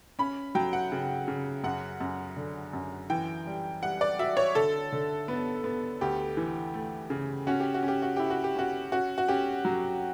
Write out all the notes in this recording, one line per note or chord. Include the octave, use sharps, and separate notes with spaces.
C#4 B5
F#3 G5
F#5
C#3
C#3
F#2 F#5
F#2
D3
F#2
E3 G5
G3
G3 F#5
D5
F#4 E5
C#5
D3 A4
D3
B3
B3
D2 G4
E3
A3
C#3
C#4 F#4
G4
F#4
C#4
G4
F#4
E4 G4
F#4
G4
C#4 F#4
C#4 F#4
F#4
C#4 G4
F#3